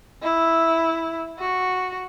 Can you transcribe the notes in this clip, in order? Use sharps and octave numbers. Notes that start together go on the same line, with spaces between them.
E4
F#4